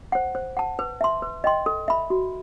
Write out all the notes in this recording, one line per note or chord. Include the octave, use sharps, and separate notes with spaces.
C5 F#5
C5
F#5 A5
B4
E5 A5 C6
B4
D#5 G5 C6
A4
E5 B5
F#4